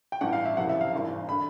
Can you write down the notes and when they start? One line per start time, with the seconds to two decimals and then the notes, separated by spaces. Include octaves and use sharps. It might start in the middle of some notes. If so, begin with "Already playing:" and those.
0.12 G5
0.21 A1 G2 E3 F#5
0.33 F5
0.45 E5
0.57 F#1 F2 C3 E3 F#5
0.69 E5
0.81 F5
0.93 G#1 G2 E3
1.29 D3 B5